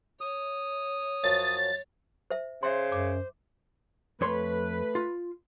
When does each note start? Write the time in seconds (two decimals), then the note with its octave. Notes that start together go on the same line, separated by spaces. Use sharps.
0.21 C#5 D#6
1.24 F#2 F3 F#3 A6
2.31 C5 E5
2.63 C#3 C5 E5 C6
2.92 F#2 D6
4.21 F2 A3 B4 C#5 C6
4.95 F4